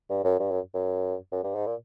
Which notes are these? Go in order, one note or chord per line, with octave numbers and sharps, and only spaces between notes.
G2
F#2
G2
F#2
F#2
F#2
G2
G#2
A#2